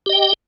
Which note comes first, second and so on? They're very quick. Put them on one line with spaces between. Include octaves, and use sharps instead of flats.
G4 D#5 G5